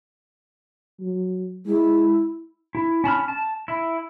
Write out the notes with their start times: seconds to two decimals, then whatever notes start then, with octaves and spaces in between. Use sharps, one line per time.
1.00 F#3
1.66 G#3 E4
2.75 E4
3.04 C#4 A5 B5 F6
3.28 A5
3.68 E4